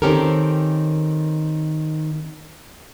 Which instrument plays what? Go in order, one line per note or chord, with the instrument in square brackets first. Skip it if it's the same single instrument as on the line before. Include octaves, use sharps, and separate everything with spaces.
[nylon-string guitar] D#3 C4 C#4 G4 A4 A#4